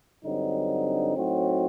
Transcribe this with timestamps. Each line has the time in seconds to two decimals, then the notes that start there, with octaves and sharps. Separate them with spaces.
0.25 G2 D3 F#3 C4 D#4
1.16 A2 F#3 C4 D#4 F#4